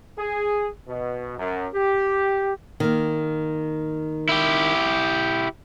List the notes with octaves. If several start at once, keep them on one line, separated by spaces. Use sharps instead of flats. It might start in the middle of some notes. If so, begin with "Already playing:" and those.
G#4
B2
F#2
G4
D#3 A#3
E4 G4